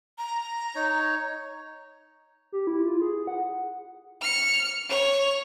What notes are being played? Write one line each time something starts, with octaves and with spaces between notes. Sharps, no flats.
A#5
D#4 C#5
G4
E4
F4
G#4
F#5
F6 C#7
C#5 F7